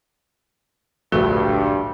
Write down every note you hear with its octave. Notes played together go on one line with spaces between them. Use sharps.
D1 A#1 G2 A3 F#4 A4